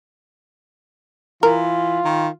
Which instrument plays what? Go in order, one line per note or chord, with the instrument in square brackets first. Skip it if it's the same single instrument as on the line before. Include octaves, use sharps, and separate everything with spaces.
[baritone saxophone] E3 [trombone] F4 [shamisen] A#4
[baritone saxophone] D#3